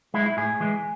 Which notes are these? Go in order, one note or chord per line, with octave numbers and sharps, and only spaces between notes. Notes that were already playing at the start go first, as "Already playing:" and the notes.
G#3 E4
E4
A2 G#4
E3 G#3